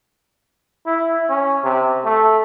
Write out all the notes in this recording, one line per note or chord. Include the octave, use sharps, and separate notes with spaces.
E4
C#4
C3
A3